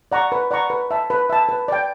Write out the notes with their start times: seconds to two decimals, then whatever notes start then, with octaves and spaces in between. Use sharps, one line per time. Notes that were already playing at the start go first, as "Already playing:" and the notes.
0.12 D5 F#5 A#5 C#6
0.32 B4
0.51 D5 F#5 A#5 C#6
0.70 B4
0.91 E5 A5
1.10 B4
1.30 E5 A5
1.49 B4
1.68 D5 G5